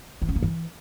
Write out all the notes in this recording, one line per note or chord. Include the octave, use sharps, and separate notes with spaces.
E3
C#4
A#3
E3